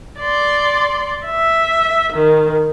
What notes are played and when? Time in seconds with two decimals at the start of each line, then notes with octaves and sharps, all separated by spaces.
0.20 D5 C6
1.25 E5
2.13 D#3